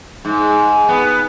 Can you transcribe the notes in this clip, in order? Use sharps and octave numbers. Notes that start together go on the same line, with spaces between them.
G#2
B3